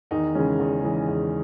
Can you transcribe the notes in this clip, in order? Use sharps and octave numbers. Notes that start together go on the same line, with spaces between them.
E2 D#3 D#4
C#3 E3 G#3 C#4
E2
C#3 E3 G#3
E2